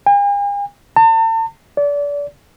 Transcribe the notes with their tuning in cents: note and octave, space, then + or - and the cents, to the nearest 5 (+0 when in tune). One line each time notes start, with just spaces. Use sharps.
G#5 -45
A5 +40
D5 -30